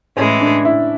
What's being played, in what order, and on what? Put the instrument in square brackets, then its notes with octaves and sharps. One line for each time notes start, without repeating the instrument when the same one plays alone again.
[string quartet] A2 E3 G#3 [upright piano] C#4
[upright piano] D4
E4